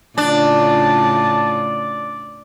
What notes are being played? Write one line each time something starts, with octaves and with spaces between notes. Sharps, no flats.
A2 C#3 D4 F4 D5 A5